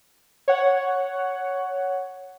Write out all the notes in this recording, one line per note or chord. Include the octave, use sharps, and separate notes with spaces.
C#5 F#5